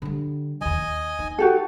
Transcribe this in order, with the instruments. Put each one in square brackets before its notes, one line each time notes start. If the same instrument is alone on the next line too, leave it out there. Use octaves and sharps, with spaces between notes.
[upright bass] D3 G3
[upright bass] D#1 D#2 [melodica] D#5 G#5
[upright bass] D#4
[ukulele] F#4 G4 A4